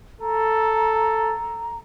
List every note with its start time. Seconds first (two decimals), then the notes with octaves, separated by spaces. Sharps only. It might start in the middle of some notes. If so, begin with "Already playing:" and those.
0.21 A4 A#5